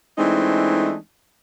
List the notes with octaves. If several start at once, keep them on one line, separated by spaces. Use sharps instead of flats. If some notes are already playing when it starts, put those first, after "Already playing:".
E3 G#3 A3 C4 D4 D#4